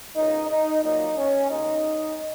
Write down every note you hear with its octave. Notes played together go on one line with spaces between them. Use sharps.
C#2 C#3 A#3 D#4
D#4
A#2 F#3 A#3 D#4
C#4
D#2 C#3 G#3 D#4